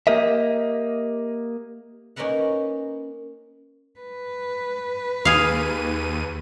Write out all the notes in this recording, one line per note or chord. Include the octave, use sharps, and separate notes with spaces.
A#3 G4 A#4 D#5 E5
A#3 C#4 D#4 A#4 B4 F#5
B4
D#2 G#4 F5 D#7